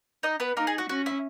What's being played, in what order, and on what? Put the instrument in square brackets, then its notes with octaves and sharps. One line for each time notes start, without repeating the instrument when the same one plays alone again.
[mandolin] D#4 D#5
B3 B4
[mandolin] A#3 A#4 [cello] D#4
[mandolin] G#4
F#4
[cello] C#4 [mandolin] F#4
[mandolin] E4